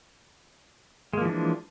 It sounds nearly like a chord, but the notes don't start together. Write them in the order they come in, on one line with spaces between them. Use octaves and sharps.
G#3 A#3 F3 E3 D4